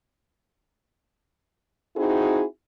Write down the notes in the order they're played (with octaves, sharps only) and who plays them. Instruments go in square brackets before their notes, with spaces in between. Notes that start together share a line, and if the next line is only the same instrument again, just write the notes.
[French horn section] C4 D#4 E4 F#4 G#4